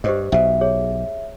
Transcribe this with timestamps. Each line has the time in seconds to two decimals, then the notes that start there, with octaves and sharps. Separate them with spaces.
0.04 G2 G4 C5 D#5
0.32 B1 B2 E5
0.61 G#4 C#5